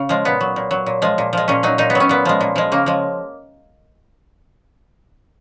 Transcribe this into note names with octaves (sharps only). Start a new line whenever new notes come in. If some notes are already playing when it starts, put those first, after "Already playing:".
Already playing: C#3
F3 G#3
A#2 B3
F#3
A#2
F#3
A#2
F3 G#3
A#2
F3 G#3
A#2 C#4
F#3 D#4
A#2 D#4
B3
F#3
C#4
A#2 B3
F3 G#3
A#2
F3 G#3
C#3 A#3
F3 G#3